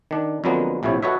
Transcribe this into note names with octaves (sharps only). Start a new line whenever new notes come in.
D#3 D4
F2 D3 F#3 G#3 A#3 B3
A#1 A2 C3 E4 C#5
F#4 A4 B4 C#5 D#5 E5